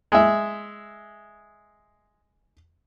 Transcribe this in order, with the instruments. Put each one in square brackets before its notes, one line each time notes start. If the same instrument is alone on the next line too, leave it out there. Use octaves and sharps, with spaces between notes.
[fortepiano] G#3 E5